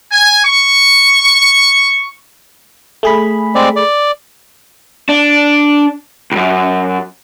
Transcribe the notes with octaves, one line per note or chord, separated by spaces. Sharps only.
G#5
C#6
A3 G#4 B5
G#3 C4 D5
D5
D4
C#2 F#2